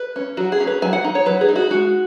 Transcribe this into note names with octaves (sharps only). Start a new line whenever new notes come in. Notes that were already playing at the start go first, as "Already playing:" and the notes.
Already playing: B4
C#4
F#3 F#4
G#4
C#4
B4
F#3 G#5
F#5
D#4
C#5
F#3 B4
G#4
D#4
F#4
G#3 F#4